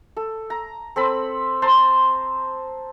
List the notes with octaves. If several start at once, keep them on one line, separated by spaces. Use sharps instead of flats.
A4
A#5
C4 A4 B5
C5 A5 A#5 C6